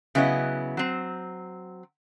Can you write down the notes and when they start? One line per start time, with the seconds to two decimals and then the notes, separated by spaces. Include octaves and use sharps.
0.15 C#3 F#3 B3 E4 D#5
0.77 F#3 C4